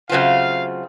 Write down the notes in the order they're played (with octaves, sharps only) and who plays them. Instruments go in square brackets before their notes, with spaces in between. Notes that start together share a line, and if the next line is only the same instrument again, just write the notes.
[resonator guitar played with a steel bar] C#3 F#3 A3 C4 F4 [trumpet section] F5